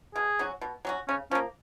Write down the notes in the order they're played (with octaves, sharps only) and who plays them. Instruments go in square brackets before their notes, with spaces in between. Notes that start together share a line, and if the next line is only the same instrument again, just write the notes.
[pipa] B2 [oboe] G#4
[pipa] F#3 C#4 F#4
B2
F#3 C#4 F#4
[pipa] C#3 [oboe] C#4
[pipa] F3 [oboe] C#4
[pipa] A#3